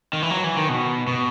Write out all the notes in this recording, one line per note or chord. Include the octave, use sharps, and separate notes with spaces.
D#3
E3
F#3
E3
D#3
B2
B2